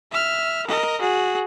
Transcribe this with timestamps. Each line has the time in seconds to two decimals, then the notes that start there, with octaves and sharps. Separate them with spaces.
0.12 E5 F6
0.67 A#4 D#5
1.01 F#4 G#4